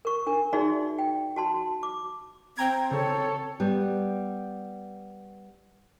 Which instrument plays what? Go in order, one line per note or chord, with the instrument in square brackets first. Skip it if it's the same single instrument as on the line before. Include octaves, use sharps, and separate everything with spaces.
[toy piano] A#4 C#6
D4 A#4
D#4 F#4 G#4 D5 E5 C6
G5
F#4 A5 C6
D6
[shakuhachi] C4 [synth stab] G5 A#5 G#6
[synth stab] C#3 [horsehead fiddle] A4 C#5
[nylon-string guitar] G3 B3